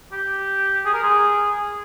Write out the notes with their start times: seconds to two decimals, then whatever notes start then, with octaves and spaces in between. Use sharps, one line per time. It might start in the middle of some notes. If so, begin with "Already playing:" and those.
0.12 G4
0.85 G#4
0.94 A#4
1.03 G#4